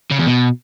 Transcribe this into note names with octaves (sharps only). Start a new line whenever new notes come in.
C#3
E2
B2